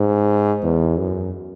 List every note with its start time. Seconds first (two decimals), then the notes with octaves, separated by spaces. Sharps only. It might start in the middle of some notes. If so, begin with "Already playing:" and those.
Already playing: G#2
0.63 E2
0.99 F#2